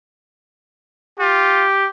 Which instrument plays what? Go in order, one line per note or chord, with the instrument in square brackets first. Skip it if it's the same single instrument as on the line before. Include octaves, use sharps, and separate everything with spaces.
[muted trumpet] F4 [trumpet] G4